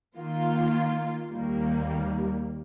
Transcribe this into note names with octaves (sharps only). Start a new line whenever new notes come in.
D#3 A#3 F4
D#2 D#3 G3 A#3